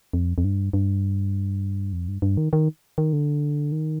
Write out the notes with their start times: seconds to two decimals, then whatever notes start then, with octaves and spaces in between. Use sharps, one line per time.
0.13 F2
0.38 F2
0.45 G2
0.73 G2
1.93 F2
2.08 G2
2.22 G2
2.37 D#3
2.53 D#3
2.98 D#3
3.13 D3
3.72 D#3